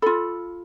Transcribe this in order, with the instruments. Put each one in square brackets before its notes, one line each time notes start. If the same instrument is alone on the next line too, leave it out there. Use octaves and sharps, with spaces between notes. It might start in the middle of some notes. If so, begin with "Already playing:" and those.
[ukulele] F4 A4 B5